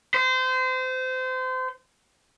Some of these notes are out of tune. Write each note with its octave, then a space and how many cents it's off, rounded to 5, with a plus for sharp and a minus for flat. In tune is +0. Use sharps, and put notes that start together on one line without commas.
C5 -30